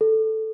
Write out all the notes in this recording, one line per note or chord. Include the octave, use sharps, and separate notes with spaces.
A4